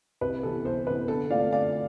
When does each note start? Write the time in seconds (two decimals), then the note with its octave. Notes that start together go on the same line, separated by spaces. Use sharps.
0.21 C2 B4
0.43 C3 E3 B3 A4
0.65 C2 A4 C5
0.87 C3 E3 B3 B4
1.08 D3 A4
1.30 A3 C4 F4 D5 F5
1.52 D3 D5 F5